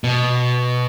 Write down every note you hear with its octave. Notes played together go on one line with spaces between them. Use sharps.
B2